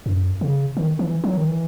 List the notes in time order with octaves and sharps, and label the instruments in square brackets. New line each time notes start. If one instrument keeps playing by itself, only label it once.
[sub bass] F#2
C#3
D#3
E3
F#3
D#3
E3